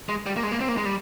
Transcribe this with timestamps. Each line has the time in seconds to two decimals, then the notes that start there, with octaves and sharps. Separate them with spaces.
0.09 G#3
0.26 G3
0.36 A#3
0.43 G#3
0.52 A#3
0.61 C4
0.69 A#3
0.77 G#3
0.85 G3